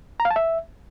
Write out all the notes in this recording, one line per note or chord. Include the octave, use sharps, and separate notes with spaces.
A#5
F5
A5
E5